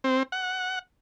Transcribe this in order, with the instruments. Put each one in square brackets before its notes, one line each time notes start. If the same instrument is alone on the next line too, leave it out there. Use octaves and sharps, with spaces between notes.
[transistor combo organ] C4
F#5